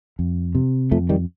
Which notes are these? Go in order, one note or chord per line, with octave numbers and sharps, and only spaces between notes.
F2
C3
F2 F3 A3
D#3 G3